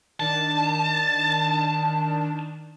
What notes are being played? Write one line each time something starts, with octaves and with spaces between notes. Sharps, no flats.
D#3 D4 A5